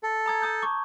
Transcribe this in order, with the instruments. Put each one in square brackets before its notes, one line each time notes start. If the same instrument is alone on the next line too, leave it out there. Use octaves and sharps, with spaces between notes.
[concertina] A4
[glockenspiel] A#5 D#6 G#6
A5 D#6 G6
C#6 D6